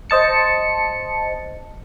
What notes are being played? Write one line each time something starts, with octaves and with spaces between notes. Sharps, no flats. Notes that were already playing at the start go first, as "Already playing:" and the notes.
C5 D#5 A5 C#7